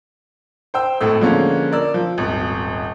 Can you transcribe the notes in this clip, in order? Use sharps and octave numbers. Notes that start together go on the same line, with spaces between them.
C5 G5 E6
G#1 A2 A3 E6
D3 F3 G#3 A#3 C#4
A#4 D5 E6
F3
D#1 G#1